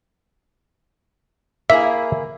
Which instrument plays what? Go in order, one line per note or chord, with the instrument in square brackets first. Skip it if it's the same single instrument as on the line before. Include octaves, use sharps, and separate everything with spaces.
[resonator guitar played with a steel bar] A#3 E4 G#4 [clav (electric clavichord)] E5